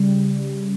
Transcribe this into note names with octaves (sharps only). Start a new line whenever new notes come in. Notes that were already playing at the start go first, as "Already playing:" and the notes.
Already playing: C#3 G3
G3